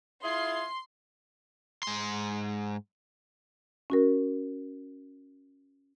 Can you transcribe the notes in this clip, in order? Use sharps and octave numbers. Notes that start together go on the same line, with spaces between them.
E4 F4 G#4 C6
G#2 C6
C#4 F#4 A#4